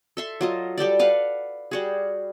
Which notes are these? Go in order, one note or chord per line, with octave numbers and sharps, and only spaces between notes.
A4 E5 C6
F#3 F4 D#5
G3 G4 A4 D5
B4 F5 F#5
G3 F#4 G#4